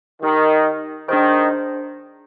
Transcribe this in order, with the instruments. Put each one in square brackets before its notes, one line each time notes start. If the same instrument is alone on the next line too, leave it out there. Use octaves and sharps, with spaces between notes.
[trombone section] D#3 [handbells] D#4 G4 A#4 D#5
[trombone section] D#3 [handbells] D4 G#4 C5